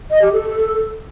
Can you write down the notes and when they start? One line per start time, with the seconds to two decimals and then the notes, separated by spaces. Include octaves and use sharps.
0.10 D#5
0.22 G4
0.33 A4